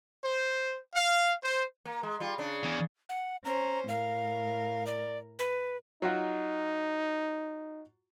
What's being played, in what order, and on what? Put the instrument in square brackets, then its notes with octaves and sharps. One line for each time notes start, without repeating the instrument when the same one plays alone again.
[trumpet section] C5
F5
C5
[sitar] A#3
G#3
G3 F4
C#3 D4
[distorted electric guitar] E2
[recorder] F#5
[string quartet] C#4 C5 [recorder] A#5
[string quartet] A2 A#4 [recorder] F5
[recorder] D5
B4
[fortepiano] F#3 F4 F#4 [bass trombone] D#4